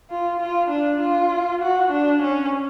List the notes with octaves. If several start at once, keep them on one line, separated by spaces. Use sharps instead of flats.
F4
F4
D4
F4
F#4
D4
C#4